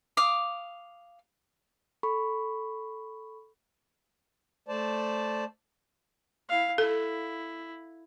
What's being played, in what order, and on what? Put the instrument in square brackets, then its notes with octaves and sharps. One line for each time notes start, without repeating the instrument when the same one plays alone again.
[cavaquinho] F5 D6 D#6
[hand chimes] A4 B5 C#6
[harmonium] A3 C5 D5 A5
[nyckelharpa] E4 F5
[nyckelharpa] E4 [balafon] A4